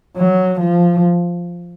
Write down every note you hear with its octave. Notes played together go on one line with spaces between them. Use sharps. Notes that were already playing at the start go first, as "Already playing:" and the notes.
F#3
F3